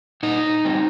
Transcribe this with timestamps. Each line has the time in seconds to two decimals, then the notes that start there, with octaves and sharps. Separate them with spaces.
0.23 A#2 D#4
0.65 G3 C4